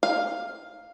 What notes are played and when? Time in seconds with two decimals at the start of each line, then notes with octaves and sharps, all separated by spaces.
0.03 F5